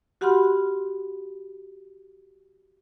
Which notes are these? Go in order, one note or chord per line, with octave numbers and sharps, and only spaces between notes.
F#4 G4 F#5 B5 C6 F6